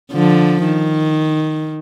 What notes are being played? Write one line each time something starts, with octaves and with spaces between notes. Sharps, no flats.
D3 F3
D#3